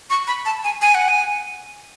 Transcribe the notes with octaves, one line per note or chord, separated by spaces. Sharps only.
C#6
B5
A5
G#5
G#5
F#5
G#5